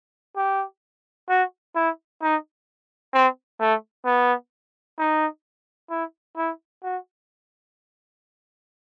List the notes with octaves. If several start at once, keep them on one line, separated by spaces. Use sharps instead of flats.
G4
F#4
E4
D#4
C4
A3
B3
D#4
E4
E4
F#4